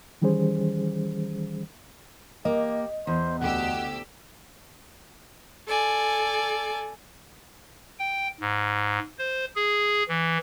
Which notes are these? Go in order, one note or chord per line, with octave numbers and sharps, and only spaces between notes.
D#3 E3 G3 C#4 G#4 C5
A#3 G4 D#5
E2 C5
D2 G4 F#5 E6
A4 D5 G#5
G5
G#2
C5
G#4
E3